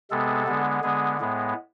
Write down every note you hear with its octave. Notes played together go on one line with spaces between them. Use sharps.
C3 G#3 B3 A4
D3 G#3 B3
D3 G#3 B3 G#4
A2 G#3 B3